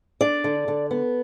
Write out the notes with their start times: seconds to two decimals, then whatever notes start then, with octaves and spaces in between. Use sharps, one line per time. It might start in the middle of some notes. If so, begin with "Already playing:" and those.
0.21 D4 D5
0.44 D3
0.68 D3
0.91 B3